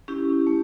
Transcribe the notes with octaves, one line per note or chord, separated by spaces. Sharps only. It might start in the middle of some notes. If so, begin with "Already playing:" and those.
C#4 E4 G4
A3